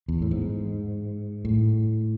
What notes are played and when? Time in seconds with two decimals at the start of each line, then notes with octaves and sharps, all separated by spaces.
0.08 E2
0.22 A2
0.31 G#2
1.45 A2